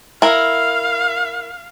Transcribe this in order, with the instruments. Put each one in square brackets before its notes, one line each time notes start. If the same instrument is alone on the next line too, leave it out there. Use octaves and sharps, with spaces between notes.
[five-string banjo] E4 A#4 [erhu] F5